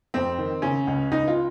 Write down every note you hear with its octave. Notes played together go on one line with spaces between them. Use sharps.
F2 C4
D#3
C#3 C#4
C#2
C#2 D#4
F4